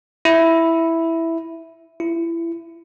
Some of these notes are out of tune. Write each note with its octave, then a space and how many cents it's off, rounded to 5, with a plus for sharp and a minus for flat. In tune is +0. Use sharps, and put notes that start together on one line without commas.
E4 +0
E4 +25